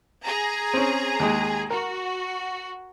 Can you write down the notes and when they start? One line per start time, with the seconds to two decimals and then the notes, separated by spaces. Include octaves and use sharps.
0.25 G#4 A#5
0.74 C4 C#4
1.20 D#2 G#3
1.70 F#4 A#4